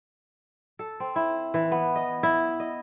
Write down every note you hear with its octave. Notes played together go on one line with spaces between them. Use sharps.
A4
C4
E4
E3
B3
D#5
E4
D#5